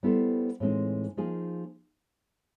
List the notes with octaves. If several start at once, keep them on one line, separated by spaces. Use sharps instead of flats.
G3 B3 E4 A4 C5
A2 E3 G#3 C4 D#4
F3 A#3 D#4 G#4